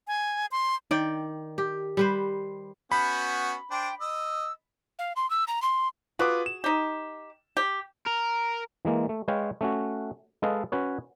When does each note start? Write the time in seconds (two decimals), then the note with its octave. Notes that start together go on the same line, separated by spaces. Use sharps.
0.08 G#5
0.52 C6
0.91 D#3 D5 G5
1.58 G4
1.97 G3 B4 C5
2.92 B3 C#4 F#4 B5 G6
3.71 D4 C5 G5
4.00 D#5 E6
4.99 F5
5.16 C6
5.30 E6
5.48 A#5
5.62 C6
6.19 F4 F#4 G#4 B4 D6
6.46 E7
6.64 D#4 G4
7.57 G4
8.07 A#4
8.85 E3 G#3 A#3
9.09 A3
9.28 G#3 B4 C#5 F5 G5
9.61 A3 C#4 F#4
10.42 G#3 A4 B4 D#5 F5
10.72 C#4 F#4 B4 C#5